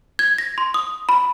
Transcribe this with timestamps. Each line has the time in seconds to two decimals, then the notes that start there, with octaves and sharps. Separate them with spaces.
0.19 G#6
0.38 A#6
0.58 C6
0.74 D#6
1.09 B5